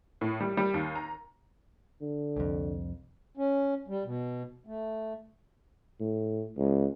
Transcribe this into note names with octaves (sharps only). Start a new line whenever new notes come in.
A2
G3
G3
D#2
A#5
D3
C2 F2
C#4
G3
B2
A3
A2
C#2